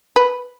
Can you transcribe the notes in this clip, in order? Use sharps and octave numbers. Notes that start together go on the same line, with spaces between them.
B4